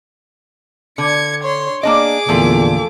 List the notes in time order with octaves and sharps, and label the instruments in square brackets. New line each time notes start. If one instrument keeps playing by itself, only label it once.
[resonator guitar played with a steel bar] D3 [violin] G#6 C#7
[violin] C#5 C6
[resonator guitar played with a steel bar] A#3 D4 D#5 [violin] G#4 D6
[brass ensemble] E2 A#2 D3 [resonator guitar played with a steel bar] F3 A3 A4